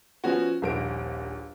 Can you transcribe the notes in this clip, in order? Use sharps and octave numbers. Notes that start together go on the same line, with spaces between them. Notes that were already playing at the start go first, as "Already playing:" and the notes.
F3 B3 C#4 F#4
D#1 A#1 D7